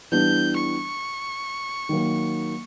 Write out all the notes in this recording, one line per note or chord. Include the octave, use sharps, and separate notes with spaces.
E3 G3 B3 D4 G6
C#6
D#3 F#3 A#3